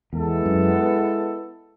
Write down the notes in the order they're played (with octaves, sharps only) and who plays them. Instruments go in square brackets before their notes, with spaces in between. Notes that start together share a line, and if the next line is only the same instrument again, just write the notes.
[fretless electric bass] E2 [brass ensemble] G#3 B3 E4 A4
[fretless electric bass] F#2